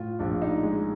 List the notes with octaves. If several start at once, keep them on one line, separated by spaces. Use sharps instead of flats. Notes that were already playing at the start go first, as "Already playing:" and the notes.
Already playing: A2 F4
A#1 D4
D#4
G#3